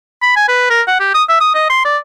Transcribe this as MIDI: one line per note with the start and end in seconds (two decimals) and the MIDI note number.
0.22 0.35 83
0.36 0.48 80
0.49 0.69 71
0.70 0.82 70
0.87 0.98 78
1.00 1.11 67
1.14 1.23 87
1.29 1.39 76
1.41 1.54 87
1.54 1.66 75
1.70 1.83 84
1.85 1.98 74